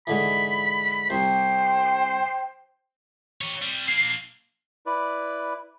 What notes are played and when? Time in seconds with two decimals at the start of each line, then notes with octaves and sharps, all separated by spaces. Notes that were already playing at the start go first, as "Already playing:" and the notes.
0.07 G#2 D3 E3 B5
1.10 C2 C5 G5
3.41 G4 C#5
3.62 C3 G3
3.88 A#3 D4 C7
4.86 E4 B4 D5